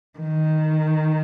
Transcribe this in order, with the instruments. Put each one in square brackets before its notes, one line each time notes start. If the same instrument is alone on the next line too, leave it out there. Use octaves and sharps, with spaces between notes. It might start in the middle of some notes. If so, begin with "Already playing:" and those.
[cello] D#3